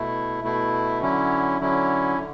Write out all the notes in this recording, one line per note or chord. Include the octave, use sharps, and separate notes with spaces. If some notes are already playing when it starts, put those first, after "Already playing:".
Already playing: B2 A3 E4
B2 A3 E4
D3 F#3 C#4 E4
D3 F#3 C#4 E4
D3